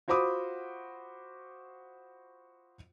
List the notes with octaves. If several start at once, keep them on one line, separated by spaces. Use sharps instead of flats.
F4 F#4 C5 B5 D6 D#6